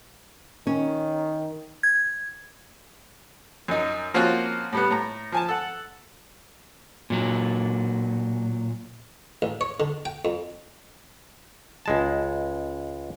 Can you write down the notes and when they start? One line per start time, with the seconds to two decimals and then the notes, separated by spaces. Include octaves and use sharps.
0.67 D#3 C#4
1.83 G#6
3.68 F#2 D#4
4.14 F3 A#3 C4 C#4 F4 F#4
4.72 A2 G3 B3
4.90 A2 A#5
5.32 F3 G#5 A5
5.49 A4 F#5
7.10 A#2 F#3
9.42 A1
9.61 C#5
9.80 D3
10.05 G5
10.25 F2
11.86 C#2 G#3 A5